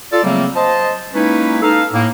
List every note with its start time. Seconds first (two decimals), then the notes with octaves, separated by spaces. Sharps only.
0.12 F4 A4 D5
0.23 C#3 F#3 G3 A3 A#3 C4
0.55 C5 D#5 A5
1.14 G#3 A#3 C#4 D#4 E4 B4
1.62 D#4 A4 F5
1.93 A2 A#3